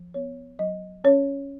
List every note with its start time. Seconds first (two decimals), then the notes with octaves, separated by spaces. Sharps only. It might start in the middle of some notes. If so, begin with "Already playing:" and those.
Already playing: F3
0.14 B3 C#5
0.59 F#3 D#5
1.04 C#4 C#5